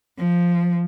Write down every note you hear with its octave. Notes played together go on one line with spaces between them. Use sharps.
F3